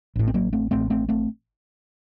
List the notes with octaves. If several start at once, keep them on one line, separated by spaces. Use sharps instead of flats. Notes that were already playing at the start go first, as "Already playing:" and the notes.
A1 A2
C4
F#3 A#3
A3 C4
A1 A2 A3 C4
A3 C4
A3 C4